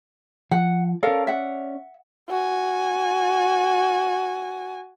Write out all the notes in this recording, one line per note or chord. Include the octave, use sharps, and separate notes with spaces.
F3 F#5
C#4 A4 A#4 D5 F5
E5 F#5
F#4 G#5